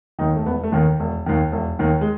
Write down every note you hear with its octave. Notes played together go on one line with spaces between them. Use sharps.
D#2 D#3 D#4
A3
E1 B3
A3
D#2 D#3
E1
D#2 D#3
E1
D#2 D#3
G#3